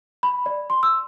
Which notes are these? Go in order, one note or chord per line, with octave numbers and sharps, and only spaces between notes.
B5
D5
C6
E6